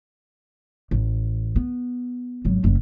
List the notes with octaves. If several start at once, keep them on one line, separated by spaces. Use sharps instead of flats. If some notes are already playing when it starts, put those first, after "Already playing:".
A1
B3
G#1 F#3
F#1 C#3